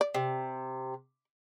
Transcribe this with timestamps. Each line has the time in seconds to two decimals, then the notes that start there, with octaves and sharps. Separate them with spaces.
0.01 D5
0.14 C3